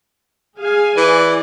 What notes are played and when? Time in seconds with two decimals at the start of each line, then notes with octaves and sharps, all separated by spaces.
0.58 G#4 F5 G#5
0.97 E3 D5